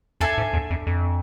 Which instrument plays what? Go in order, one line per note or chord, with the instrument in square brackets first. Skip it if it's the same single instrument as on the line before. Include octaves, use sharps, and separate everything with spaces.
[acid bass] F2 [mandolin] D4 A4 E5 G#5
[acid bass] G#2
E2
F2
F2